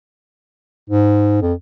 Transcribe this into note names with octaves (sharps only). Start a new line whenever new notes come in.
G#2
F2